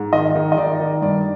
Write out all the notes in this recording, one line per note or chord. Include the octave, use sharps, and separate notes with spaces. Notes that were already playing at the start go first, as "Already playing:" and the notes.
Already playing: G#2
D#3 D#5
D#3
D#5
D#3 D5
D#3
G2 D5